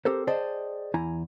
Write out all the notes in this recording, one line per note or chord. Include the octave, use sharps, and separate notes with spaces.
C4 G4 A4 A#4 C5
G#4 C5 D5 D#5 G5 A5
E2 E4 G#5 A#5